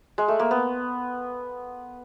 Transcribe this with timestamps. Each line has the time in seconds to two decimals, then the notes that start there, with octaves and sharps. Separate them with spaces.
0.18 G#3
0.28 A3
0.39 A#3
0.51 B3